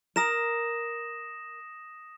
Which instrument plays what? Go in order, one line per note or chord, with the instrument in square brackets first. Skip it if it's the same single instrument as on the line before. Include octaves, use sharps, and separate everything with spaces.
[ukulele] A#4 A#5 [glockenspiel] D#6 A#6 E7